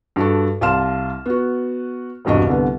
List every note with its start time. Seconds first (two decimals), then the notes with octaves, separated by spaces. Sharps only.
0.16 G2 F#4 A4
0.61 C2 F5 A5 C6 F6 E7
1.26 B3 F#4
2.25 E1 C2 G2 F#4 D#5
2.47 C2 D3 B3